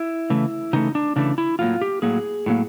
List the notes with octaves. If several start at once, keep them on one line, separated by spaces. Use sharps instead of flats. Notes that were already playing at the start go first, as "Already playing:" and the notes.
Already playing: E4
C#3 E3 A3
C#3 E3 A3 D#4
D4
C#3 E3 A3 D4
E4
A2 F#3 A#3 F4
G4
A2 F#3 A#3 G#4
A2 F#3 A#3